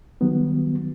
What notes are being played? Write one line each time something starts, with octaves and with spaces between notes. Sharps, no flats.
D#3 F#3 G3 B3